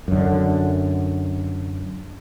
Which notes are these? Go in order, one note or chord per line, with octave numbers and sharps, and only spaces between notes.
F#2 D3